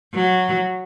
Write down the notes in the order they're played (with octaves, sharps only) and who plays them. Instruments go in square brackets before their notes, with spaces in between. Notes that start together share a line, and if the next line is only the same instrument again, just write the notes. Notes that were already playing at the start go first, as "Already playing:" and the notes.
[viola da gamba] F#3